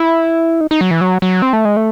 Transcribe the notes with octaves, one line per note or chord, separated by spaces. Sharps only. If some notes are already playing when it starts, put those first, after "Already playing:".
Already playing: E4
D#4
D#4
F#3
E3
F#3
F#3
C4
A3
G#3
A3